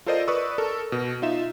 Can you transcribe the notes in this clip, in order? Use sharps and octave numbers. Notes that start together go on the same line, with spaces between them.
F4 A4 A#4 C5 D5 D#5
B4 D5 C#6 D#6 E6
A4 A#4
B2
D#4 F4 E5 E7